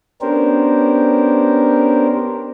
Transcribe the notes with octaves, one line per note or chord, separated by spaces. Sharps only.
B3 C#4 D4 G4 A#4 C5